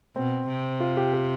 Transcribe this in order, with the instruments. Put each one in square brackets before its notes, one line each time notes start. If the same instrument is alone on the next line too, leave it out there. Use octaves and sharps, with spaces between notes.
[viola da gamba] B2 [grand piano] C4
[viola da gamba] C3
[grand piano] F4
G4
G4